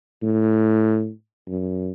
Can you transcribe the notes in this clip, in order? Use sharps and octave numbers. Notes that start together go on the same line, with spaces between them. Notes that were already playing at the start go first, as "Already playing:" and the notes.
A2
F#2